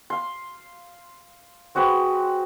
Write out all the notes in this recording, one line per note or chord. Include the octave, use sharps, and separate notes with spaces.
F5 C6
C4 F#4 G#4 B4